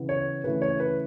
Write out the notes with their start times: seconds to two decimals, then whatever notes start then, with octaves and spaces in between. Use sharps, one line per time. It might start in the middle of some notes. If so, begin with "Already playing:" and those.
Already playing: C#3 E3 B3
0.09 C#5
0.44 C#3 E3 A3 B4
0.62 C#5
0.80 B4